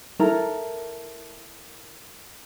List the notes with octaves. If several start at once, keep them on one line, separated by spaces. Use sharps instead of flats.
E4 A4 A#4 A#5